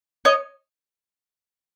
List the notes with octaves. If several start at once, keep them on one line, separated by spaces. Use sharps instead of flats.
C#5 D#5